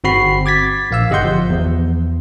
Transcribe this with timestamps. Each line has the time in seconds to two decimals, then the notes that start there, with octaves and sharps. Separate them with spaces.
0.04 G1 C4 F#4 B5 C7
0.46 D6 G#6 A6 B6
0.91 A#1 F5 E6
1.10 G1 G4 D#5 F#5 C6 G6
1.25 F3
1.50 E2